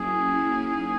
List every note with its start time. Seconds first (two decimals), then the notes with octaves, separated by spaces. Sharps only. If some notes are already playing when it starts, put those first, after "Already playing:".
Already playing: F#3 A#3 C#4 E4 G#4
0.63 A#3 D#4